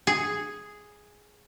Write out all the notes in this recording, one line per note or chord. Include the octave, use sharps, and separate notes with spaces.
G#4